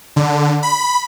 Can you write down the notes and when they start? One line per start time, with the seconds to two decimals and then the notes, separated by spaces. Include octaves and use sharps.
0.16 D3
0.63 B5